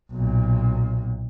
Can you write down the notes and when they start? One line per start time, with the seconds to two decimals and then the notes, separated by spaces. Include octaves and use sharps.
0.12 B1 A#2